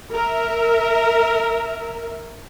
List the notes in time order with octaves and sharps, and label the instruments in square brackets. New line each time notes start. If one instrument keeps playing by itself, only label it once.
[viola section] A#4 E5